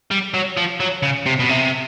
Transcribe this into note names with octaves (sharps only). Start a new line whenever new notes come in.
G3
F#3
F3
F#3
C#3
C3
B2
C3